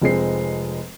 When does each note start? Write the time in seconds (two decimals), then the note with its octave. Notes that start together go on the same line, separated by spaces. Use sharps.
0.02 F1 F3 G#3 C4 C7